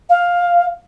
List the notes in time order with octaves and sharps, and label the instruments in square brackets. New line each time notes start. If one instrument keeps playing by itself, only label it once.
[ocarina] F5